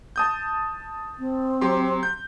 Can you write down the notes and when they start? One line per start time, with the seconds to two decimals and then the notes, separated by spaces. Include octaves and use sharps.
0.16 A5 D#6 G6
1.19 C4
1.61 F#3 G4 C6
2.03 G6